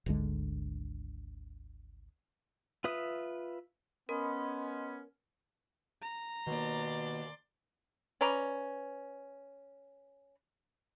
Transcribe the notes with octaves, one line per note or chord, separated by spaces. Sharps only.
G#1 D2 D3 G#3
F4 B4 E5 D#6
B3 C#4 A#4 D#5 B5 C6
A#5
B2 D#3 A#3 D5 C6
C#4 B4 D5 A#5